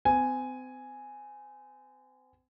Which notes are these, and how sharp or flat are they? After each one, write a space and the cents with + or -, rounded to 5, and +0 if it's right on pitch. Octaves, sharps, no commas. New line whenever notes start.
C4 -40 G#5 +0